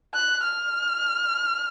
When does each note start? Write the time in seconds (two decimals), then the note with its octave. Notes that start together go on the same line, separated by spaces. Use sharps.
0.14 F#6
0.43 F6